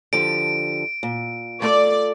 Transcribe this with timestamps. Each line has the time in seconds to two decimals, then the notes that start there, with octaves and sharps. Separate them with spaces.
0.13 D3 F3 G4 D7
1.03 A#2
1.62 A3 F4 A4 D5